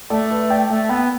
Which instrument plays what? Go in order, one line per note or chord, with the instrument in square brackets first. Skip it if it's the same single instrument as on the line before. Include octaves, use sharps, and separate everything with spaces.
[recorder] A3 [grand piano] A4 D5
[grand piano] B4 E5
D5 G5
[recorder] A3 [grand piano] E5 A5
[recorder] B3 [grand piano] G5 B5